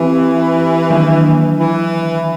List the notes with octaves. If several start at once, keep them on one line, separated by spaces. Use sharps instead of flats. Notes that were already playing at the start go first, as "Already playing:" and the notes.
Already playing: E3 C4 G4
D#3 F#3 A#3 D4
E3